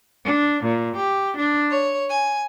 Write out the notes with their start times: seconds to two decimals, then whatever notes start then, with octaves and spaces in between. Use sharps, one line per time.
0.24 D4
0.63 A#2
0.95 G4
1.37 D4
1.71 C#5
2.09 G#5